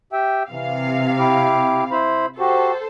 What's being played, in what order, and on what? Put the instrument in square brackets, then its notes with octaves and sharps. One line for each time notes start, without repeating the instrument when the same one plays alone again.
[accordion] G4 E5 G5
[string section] C3 F5 [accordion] E3
[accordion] E4 G4 D6
E4 C5 B5
[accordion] F#4 G4 [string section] A4 C5